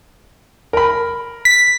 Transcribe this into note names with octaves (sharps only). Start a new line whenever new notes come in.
A#4 B5
B6